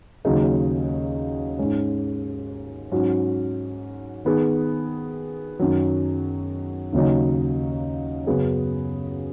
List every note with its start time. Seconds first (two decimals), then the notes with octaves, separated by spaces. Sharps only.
0.25 D#2 C#3 F#3 D#4 G#4
1.59 G#2 G#3 C#4
2.92 G#2 F#3 C#4 F#4
4.25 D#3 B3 G#4
5.59 F#2 D#3 F#3
6.93 D#2 C#3 F#3 D#4
8.27 F#2 C#3 F#3 B3 G#4